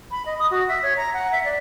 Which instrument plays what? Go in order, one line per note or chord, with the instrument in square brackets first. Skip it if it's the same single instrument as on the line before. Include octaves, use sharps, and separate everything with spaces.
[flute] B5
D#5
D#6
F#4
E5
C#5
A#5
F#5
E5
D5